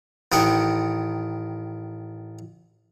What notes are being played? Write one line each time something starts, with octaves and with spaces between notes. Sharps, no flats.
A1 D#3 D#5 F#5 G5